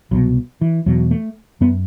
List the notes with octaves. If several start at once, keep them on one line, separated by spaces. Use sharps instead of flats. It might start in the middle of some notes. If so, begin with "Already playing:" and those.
C2 B2 F#3
E3
E2 B2 F#3
A3
F#2 B3